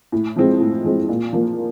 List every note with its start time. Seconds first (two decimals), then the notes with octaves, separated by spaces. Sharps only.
0.12 A2
0.36 F3 G#3 C4
0.60 A2
0.84 F3 G#3 C4
1.09 A#2
1.33 F3 A#3